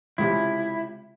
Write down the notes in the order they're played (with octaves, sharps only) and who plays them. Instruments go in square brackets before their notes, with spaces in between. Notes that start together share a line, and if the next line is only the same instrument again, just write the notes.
[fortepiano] C#2 C3 [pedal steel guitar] E4